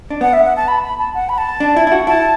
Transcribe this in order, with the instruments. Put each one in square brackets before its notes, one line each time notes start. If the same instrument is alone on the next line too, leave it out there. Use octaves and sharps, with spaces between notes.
[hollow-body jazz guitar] D4
[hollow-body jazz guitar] B3 [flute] F#5
[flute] E5
F#5
A5
B5
B5
A5
F#5
B5
A5
[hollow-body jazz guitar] D4
E4
E4
F#4
[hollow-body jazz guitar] E4 [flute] A5